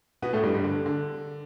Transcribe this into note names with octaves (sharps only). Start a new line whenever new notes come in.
B2 B3
A2 A3
G2 G3
G2 G3
D3
D3